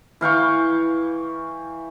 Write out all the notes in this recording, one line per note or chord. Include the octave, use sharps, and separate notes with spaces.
E3 F5 G5 C#6